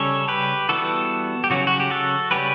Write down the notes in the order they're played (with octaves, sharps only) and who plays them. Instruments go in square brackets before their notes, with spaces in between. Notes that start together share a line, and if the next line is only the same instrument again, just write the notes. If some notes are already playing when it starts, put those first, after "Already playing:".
Already playing: [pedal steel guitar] C#3 G3 C#4 A4 C#5
G4 B4
E3 G3 B3 F#4 A4
G4
C#3 F#3 C#4 F#4
F#4
G4
F#4 A4
C#3 G3 C#4 G4 B4